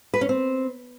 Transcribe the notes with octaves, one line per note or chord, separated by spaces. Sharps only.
B4
C#4
C4